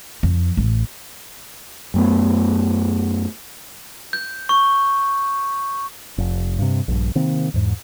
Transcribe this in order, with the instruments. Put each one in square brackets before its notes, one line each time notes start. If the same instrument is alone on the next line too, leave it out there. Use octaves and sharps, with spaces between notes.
[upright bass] F2
A1
[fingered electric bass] F#2 A3 B3
[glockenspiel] G6
C#6
[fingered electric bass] F1
G2 C3
A#1 G2
C3 D#3 A#3 C4
E2 G#2